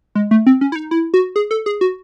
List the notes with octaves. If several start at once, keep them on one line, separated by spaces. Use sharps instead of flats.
G#3
A3
C4
C#4
E4
D#4
E4
F#4
G#4
A4
G#4
F#4